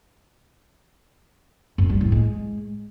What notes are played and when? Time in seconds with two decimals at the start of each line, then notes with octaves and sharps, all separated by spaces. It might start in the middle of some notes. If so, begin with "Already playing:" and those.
1.78 F#2
1.90 G3
2.01 A2
2.12 G#3